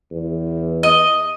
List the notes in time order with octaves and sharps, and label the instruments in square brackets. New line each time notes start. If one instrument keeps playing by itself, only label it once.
[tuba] E2
[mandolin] D#5